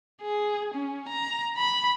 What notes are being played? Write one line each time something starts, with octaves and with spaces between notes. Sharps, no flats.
G#4
C#4
A#5
B5